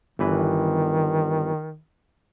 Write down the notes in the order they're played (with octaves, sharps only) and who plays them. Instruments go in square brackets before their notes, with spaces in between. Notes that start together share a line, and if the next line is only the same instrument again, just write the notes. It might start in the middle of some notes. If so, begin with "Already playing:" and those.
[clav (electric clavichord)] G1 E3 B4 [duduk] D#3